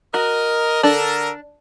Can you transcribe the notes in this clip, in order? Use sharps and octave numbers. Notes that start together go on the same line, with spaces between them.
F#4 A#4 D#5
D3 D4 A4 A#4